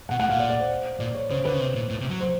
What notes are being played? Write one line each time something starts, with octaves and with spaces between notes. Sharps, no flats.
B2 F#5
A2 F#5
A#2 F5
D5
D5
C5
A#2 D5
C#5
C#3 C5
D3 B4
C#3
C3
A#2
A2
C3
F#3
C5